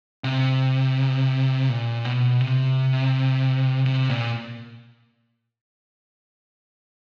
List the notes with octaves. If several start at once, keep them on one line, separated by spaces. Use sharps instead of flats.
C3
A#2
B2
C3
C3
A#2